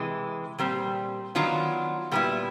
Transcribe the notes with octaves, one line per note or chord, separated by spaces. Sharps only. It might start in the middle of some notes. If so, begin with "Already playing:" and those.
Already playing: C3 E3 G#3
A#2 G3 C4
D#3 F#3 B3 D4 F4
A#2 G3 B3 E4